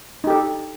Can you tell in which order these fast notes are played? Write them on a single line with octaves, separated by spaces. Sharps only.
D#4 G4 A4